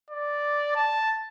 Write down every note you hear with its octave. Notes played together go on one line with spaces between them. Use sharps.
D5
A5